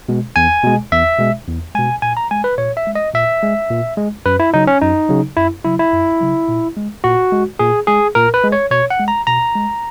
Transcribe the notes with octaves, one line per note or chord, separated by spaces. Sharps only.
B2 G#3
E2 G#5
B2 G#3
E2 E5
B2 G#3
E2
B2 G#3 G#5
A#2 G#5
A#5
G#3 G#5
B4
A#2 C#5
E5
G#3
D#5
A#2 E5
G#3
A#2
G#3
F#2 B4
E4
C#3 F#3 D#4
C#4
F#2 D#4
C#3 F#3
F#2 E4
C#3 F#3 E4
E4
F#2
C#3 F#3
A#2
G#3
A#2 F#4
G#3
A#2 G#4
G#3 G#4
A#2 A#4
B4
G#3
C#5
B2 C#5
F#5
G#3
A#5
B2 A#5
G#3